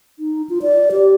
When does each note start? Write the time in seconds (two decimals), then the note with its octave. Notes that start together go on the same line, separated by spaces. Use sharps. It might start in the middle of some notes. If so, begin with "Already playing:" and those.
0.19 D#4
0.50 F4
0.62 D5
0.92 G4